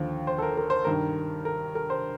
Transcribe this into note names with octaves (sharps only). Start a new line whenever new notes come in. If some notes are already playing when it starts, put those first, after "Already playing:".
Already playing: D#2 D3 F3
C5
A4
A#4
A#4
C5
G2 D#3 A#4
A#4
A#4
C5